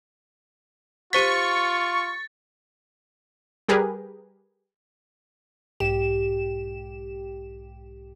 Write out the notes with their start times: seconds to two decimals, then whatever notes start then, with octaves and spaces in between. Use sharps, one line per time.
1.13 F4 G4 C5 C#6 A6 B6
3.69 G3 G4 G#4 A#4 B4
5.80 B1 G#2 G4 E7